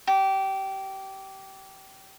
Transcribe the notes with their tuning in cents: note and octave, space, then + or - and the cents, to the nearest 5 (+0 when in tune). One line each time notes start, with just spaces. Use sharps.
G4 -20